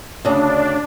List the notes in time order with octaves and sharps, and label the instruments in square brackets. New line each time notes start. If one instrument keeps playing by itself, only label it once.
[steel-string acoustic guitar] D2 C#3 [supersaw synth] D4